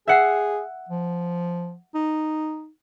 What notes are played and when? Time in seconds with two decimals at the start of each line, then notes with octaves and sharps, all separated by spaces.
0.08 G#4 E5 F#5 C7
0.89 F3
1.95 D#4